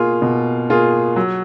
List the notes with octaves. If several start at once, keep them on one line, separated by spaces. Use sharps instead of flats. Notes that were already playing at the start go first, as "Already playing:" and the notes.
Already playing: B2 A#3 F4 G#4
B2
A#3 F4 G#4
F#3